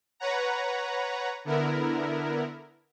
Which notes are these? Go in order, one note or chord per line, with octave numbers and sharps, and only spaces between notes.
B4 C#5 F#5 A#5
D3 B3 E4 A#4